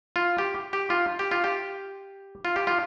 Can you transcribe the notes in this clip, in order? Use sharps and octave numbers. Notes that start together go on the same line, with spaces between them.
F4
G4
G4
F4
G4
F4
G4
F4
G4
F4